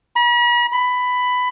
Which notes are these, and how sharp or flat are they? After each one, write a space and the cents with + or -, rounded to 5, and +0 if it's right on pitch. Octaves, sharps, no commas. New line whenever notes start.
B5 -45
B5 +10